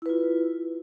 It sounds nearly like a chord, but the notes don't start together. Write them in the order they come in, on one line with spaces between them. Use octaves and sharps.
E4 B4 F4